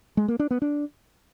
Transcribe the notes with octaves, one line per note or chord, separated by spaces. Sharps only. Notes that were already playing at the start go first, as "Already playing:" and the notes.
G#3
A#3
D4
B3
D4